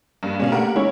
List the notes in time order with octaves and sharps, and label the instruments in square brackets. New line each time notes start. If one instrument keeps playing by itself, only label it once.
[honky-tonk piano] G2 A#3
[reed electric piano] B2 G#3 [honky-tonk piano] C#4 D4 F5
[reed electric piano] A3 A#3 G4 [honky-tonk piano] A#4 F#5
[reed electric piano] G#3 C#4 C#5 [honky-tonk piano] E4